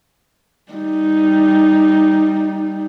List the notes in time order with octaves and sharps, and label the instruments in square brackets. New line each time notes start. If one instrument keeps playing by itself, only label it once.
[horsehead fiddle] G3 D#4